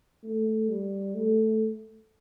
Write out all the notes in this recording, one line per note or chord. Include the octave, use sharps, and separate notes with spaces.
A3
G3
A3